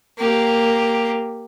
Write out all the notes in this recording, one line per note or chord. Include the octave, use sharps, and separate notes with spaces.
A#3 G4